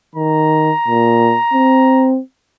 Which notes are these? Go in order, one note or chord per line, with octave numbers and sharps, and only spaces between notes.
D#3 A#5
A#2
C4